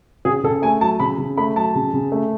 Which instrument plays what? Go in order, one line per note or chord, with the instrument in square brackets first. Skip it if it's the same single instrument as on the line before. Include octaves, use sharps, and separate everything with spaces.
[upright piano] C#3 G#4
C#3 A4
A3 G#5
F#3 A5
C#3 B5
C#3
A3 B5
F#3 A5
C#3
C#3
A3